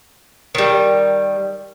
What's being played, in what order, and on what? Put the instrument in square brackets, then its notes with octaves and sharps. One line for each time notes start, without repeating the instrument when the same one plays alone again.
[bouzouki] D#3 G3